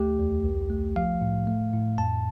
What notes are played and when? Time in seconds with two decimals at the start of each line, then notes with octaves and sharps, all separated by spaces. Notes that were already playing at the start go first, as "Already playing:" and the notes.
Already playing: D2 A3 G4
0.19 E2
0.44 C2
0.70 A3
0.96 F3 F5
1.21 A2
1.47 A3
1.73 A2
1.98 F2 A5